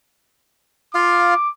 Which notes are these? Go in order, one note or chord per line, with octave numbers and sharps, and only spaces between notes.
F4 F5 D6